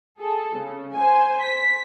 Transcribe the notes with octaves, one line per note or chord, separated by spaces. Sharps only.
G#4 A4
C#3
C5 G#5
B6